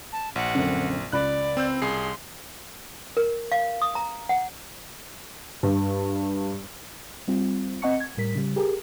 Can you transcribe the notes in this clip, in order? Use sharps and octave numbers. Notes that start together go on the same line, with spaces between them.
A5
A#1 F#5
F#2 D3 C4
C#2 D5 B5 F#6
C4 E6 G6
C2 G#4 C6 C7
A#4
F5
D#6
A#5
F#5
G2
G3 C4 F4
C4 D#5 F#5 A5 C#6 C#7
G#6
A2 G3 A#4 B6
C#3 G3
G4 G#4 A#4